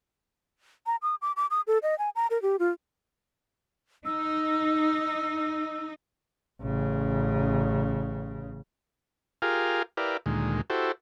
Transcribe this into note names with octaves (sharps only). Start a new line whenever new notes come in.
A#5
D#6
D6
D6
D#6
A4
D#5
G#5
A#5
A#4
G4
F4
D#4 E6
A1 C#3
F4 G4 G#4 A#4 F5
E4 G4 A#4 B4 D5 F5
D2 A#2 D#3 G#3
E4 F#4 G4 A4 C5